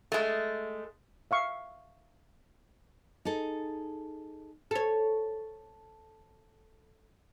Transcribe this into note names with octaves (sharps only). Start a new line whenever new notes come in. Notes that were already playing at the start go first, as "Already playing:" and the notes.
G#3 A3
E5 F5 C#6
D#4 G#4 A4
A4 C#5